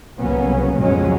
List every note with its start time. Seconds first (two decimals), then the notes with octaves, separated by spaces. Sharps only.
0.19 C2 C#3 F#3 A#3 B3 C#4
0.78 B1 F2 C#3 F#3 G#3 C#4